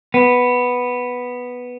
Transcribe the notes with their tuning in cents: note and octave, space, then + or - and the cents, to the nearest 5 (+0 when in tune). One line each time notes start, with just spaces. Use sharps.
B3 +0